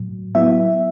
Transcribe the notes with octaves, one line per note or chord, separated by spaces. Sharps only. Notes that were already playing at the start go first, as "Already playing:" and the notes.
Already playing: A2 F#3
F#3 B3 E4 E5